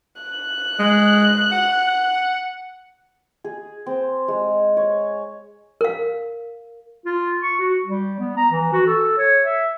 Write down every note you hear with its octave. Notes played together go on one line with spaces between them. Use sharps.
F#6
G#3
F#5
G#4
C4
G#3
C#5
A#4 F5
F4
C#6
F#4
G3
B3
A#5
E3
F#4
A4
C#5
E5